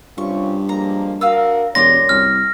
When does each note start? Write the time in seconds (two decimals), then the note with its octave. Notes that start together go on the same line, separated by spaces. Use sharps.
0.18 G2 C3 C#4 F4 C#6
0.69 F3 G#3 A#3 A#5
1.21 D4 F#4 A#4 F5 D#6 E6
1.75 E1 F#2 G4 C#5 D5 C6 A#6
2.09 C2 F6